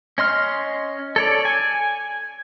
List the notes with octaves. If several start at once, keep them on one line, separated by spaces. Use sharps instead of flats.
C#4 D#5 C6 F6
A4 C#5 D5
G#5